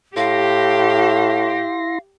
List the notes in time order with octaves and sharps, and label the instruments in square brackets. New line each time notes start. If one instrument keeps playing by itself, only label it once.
[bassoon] A2 [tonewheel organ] E4 C6 A#6 [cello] G4 [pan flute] F5